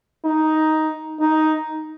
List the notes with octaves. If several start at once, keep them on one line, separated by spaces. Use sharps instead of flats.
D#4
D#4